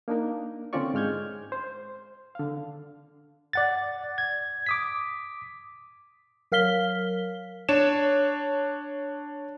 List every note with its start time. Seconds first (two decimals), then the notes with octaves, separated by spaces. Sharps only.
0.08 A#3 D4 D#4 A#4
0.73 D3 C4 C#4 F4 D5 C#6
0.94 G#2 G#3 F6 G6 G#6
1.52 C5
2.35 D3 F5
3.53 D5 F#5 A6
4.18 G#6
4.66 D6 D#6 B6
6.52 F#3 A#4 F5 F6 B6 G7
7.69 D4 C#5 E7